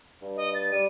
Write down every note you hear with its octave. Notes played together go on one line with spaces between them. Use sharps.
G2
D#5
A6
G3 D#7